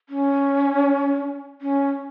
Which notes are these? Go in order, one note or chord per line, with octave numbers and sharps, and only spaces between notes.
C#4
C#4